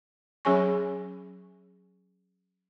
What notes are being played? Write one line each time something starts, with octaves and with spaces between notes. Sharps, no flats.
F#3 C#4 G#4 C#5 G#5 C#6